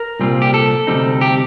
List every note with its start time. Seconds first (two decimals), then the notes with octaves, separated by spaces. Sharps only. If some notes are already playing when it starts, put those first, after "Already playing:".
Already playing: A#4
0.20 C2 A#2 G3 C4 F4
0.42 G4
0.54 A4
0.87 D2 C3 G3 C4 D#4
1.21 G4